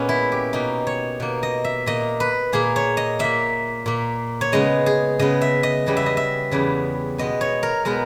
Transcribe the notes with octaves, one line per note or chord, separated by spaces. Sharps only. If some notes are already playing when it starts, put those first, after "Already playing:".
Already playing: A#2 G#3 B3 C#4
E4
G4
B2 A#3 D#4
C#5
B2 A#3
D#5
E5
A#2 A#3 D#5
B4
A#2 A#3 G#4
C#5
D#5
A#2 A#3 E5
A#2 A#3
C#5
C#3 G#3 B3 D#5
G#4
C#3 G#3 B3 D#5
E5
D#5
E2 C#3 G3 B3
E5
D#5
E5
E2 C#3 G3 B3
B2 G#3 B3 D#5
C#5
A#4
B2 G#3 B3 A#4